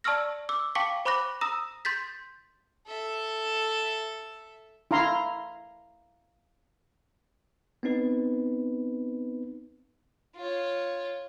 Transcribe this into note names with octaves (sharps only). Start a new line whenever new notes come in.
D5 A5 C#6 E6 F6 A#6
D6 E6
F5 G5 A5 C#6 D6 B6
C5 B5 C#6 D6 F#6 A#6
A#5 D#6 E6 A#6 E7
C6 G6 A6 B6
A4 E5
E4 F5 A#5 C6
B3 C4 D#4 B4
F4 C#5